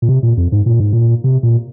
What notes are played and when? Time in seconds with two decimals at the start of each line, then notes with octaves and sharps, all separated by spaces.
0.02 A#2
0.09 C3
0.23 A#2
0.37 F2
0.52 G#2
0.66 A#2
0.80 G#2
0.93 A#2
1.24 C3
1.43 A#2